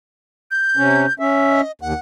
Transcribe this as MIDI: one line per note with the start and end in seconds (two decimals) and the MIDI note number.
0.51 1.13 91
0.77 1.06 48
0.77 1.06 61
1.19 1.61 61
1.19 1.61 76
1.50 1.72 75
1.81 1.93 39
1.81 2.00 78